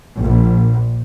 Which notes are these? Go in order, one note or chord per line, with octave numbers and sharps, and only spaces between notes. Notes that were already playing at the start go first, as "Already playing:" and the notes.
A#1